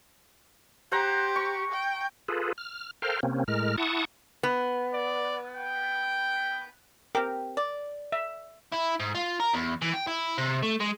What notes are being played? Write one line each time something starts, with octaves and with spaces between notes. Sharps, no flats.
G4 C5 F#5 A#5
C#6
G5
F4 G#4 A4 B4
F6
A4 A#4 C5 F5 G5 F6
C3 A#3 C4 C#4
A2 G#3 A#4 F6
E4 F#5 A5 C#6 D#6
B3
D5
G5
C4 G4 A#4
D5
E5
E4
G#2
F4
A#4
E2
E3
G5
E4
C3
A3
G#3